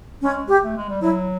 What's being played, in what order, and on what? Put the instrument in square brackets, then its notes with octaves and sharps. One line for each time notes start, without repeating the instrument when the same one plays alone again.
[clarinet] G#3 [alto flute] C#4
[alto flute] G4
[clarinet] A3
G#3
G3
[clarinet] F#3 [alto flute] E4